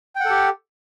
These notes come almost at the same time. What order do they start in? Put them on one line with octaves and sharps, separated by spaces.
G5 F#5 A4 G4